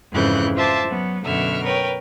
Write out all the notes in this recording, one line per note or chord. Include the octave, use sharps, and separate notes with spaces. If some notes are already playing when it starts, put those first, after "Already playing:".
F2 G#2 C#3 E3 F#6 G6
F4 C5 E5 A5 D6
F#3 B3
F#2 B2 D3 E5 F6
A#4 B4 C#5 G5